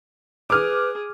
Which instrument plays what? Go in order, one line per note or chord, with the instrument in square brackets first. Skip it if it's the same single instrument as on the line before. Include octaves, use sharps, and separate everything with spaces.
[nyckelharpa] G#4 [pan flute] B4 [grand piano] D6 F6